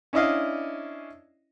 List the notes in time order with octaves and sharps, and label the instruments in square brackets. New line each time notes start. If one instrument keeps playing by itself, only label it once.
[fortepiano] C#4 D4 E4 D#5 F5